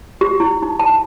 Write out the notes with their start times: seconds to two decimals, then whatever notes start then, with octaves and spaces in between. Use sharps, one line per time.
0.21 G4
0.40 E4
0.63 D#4
0.79 A5